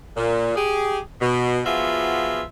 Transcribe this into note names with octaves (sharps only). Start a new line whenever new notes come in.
A#2
G4 G#4
B2
F3 B3 F4 F#4 G#4 E5